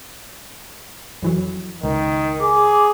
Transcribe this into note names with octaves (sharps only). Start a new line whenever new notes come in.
F2 E3 F#3
C#2 D#3
G#4 D6